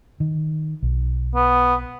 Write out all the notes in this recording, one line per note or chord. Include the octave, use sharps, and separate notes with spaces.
D#3
B1
B3